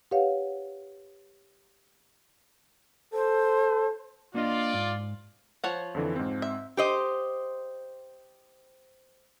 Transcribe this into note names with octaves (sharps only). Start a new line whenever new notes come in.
G4 B4 C#5 F5 F#5
A4 C5
A#3 D4 F4 D5 D#5
G#2
F3 C#5 F#5
F2 D3 E3
G#2 C4
E5
G4 C5 D#5